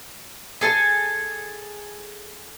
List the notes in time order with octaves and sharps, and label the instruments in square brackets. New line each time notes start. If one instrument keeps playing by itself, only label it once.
[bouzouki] G#4 A4 G5 G#5